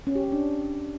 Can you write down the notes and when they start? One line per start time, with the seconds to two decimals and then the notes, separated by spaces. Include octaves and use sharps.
0.07 C#4
0.15 G4
0.24 C#4
0.32 D4